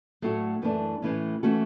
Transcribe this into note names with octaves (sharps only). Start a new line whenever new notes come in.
A2 F#3 A3 D4 F#4
F#2 E3 A3 D4
A2 E3 A3 C#4
E3 A3 C#4 F#4 A4